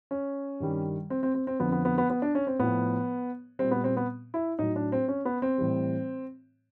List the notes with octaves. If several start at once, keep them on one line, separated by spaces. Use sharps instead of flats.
C#4
G2 D#3 G3
C4
C4
C4
C4
F2 D3 F3 B3
B3
B3
B3
B3
D4
C#4
C4
A2 F3 B3
A#2 G3 C4
B3
C4
B3
E4
A2 F#3 D#4
D4
C4
C#4
B3
C4
A2 E3 G3